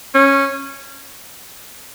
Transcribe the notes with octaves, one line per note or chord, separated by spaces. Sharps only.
C#4